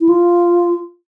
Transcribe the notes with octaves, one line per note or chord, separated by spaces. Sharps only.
E4
F4